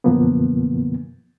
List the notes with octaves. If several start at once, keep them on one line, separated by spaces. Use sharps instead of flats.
F#2 B2 D3 F3 A#3 B3